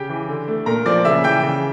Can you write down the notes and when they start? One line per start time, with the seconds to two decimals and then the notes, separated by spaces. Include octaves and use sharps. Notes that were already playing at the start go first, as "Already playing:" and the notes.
Already playing: C#3 G4 G5
0.10 E3
0.28 D3
0.48 A3
0.66 A#2 A#4 A#5
0.86 F3 D5 D6
1.05 C#3 E5 E6
1.24 E3 G5 G6
1.43 C#3